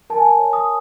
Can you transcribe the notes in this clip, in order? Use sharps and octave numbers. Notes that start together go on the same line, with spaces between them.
A#4 A5
G#5
A5
C#5
D#6